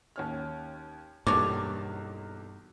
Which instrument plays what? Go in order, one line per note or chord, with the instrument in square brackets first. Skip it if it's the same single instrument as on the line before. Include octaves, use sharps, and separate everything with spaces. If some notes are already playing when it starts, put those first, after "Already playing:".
[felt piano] D#2 C#4 F6
[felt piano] B1 E2 A#3 [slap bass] G2 [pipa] C#5 D5